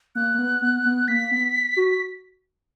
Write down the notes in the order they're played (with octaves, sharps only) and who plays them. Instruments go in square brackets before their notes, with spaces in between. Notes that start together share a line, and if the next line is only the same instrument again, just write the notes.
[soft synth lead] A#3 [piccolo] F#6
[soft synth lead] A#3
B3
B3
B3
[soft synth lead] A#3 [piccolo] B6
[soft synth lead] B3
F#4